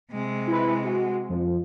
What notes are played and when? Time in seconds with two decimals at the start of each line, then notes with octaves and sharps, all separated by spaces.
0.12 C3 G#3
0.47 E4 B4
0.85 F#4
1.29 F2 F3